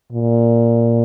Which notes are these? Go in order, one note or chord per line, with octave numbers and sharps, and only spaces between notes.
A#2